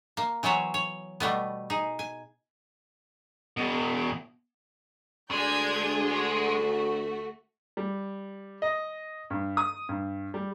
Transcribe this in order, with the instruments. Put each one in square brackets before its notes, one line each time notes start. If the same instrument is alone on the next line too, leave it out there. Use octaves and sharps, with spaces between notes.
[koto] A#3
E3 F#3 B3 C5 C#5
C#5
B2 G3 A3 B3
D#4 G#4
G#5
[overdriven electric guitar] E2 B2
[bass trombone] D2 [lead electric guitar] G#3 [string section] D4 G#4 [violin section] D5 G6 G#6
[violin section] A3 F#4
[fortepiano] G3
D#5
G2
D#6
G2
G3